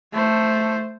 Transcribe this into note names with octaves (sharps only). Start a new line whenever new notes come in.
A3 C5